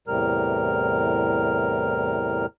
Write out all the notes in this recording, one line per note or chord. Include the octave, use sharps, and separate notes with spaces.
E2 A2 C3 G3 A#4 F6